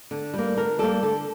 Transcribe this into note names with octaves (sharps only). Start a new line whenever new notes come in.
D3
G3 A#3
D3 A#4
G3 A#3 A4
D3 A4